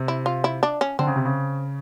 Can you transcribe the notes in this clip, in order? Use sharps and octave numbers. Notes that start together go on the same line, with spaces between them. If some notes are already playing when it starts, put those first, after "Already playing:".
Already playing: C3
E4
F4
E4
D4
C#4
D3 C4
C#3
C3
C#3